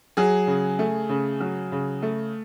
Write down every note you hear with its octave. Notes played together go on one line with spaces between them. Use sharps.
F#3 G#4
C#3
A3
C#3
F#3
C#3
A3